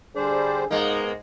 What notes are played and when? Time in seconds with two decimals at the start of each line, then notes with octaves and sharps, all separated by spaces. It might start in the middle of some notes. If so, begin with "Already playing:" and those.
0.16 D3 G3 D4 G#4 C5
0.71 G#2 G#3 A#3 B3 D#4